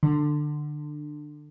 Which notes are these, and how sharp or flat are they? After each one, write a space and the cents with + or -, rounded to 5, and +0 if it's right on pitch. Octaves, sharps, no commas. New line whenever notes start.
D3 +20